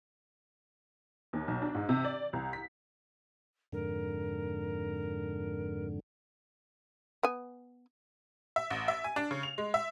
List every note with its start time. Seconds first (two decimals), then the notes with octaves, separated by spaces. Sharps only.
1.33 D#2
1.48 B1
1.62 D4
1.75 G#2
1.89 C3
2.05 D5
2.33 C2
2.53 B6
3.73 F2 G#2 D3 A#4
7.23 B3 G#5
8.56 E5
8.70 A1
8.88 E5
9.04 G#5
9.16 D4
9.31 C#3
9.43 F7
9.58 G#3
9.74 E5